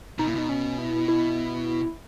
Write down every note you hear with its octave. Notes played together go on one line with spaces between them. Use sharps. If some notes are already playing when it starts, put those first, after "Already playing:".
B2 D#4
A#2 E4
B2 D#4
C#4
E4
E4